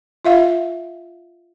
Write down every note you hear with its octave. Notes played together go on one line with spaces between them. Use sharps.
F4 E5 F5